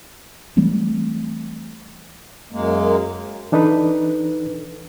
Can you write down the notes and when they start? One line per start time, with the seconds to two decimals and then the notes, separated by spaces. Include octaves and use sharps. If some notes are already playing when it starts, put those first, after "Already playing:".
0.57 E3 G3 A3 C4
2.52 F#2 G#3 A#3
3.52 E3 D4 D#4 A4 B4